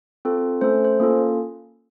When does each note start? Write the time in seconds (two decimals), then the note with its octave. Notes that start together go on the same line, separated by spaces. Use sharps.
0.25 C4 F4 A4
0.61 A3 C#4 A4 C5
0.85 C5
1.00 A#3 C#4 F4 A4